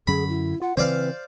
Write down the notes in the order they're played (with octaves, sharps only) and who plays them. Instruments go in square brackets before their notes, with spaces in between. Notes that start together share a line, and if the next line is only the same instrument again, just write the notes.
[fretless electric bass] F#2 F#3 C#4 [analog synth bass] D3 [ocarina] G#4 [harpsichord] B5
[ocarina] E4
[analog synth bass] F4 [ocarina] F#5
[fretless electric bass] C#3 E3 [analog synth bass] C4 [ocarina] B4 [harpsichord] C5 D5 F5